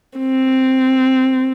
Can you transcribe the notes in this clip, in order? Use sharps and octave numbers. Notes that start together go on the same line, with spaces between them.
C4